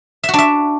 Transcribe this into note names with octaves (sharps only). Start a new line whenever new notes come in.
E5
F#4
D4
E5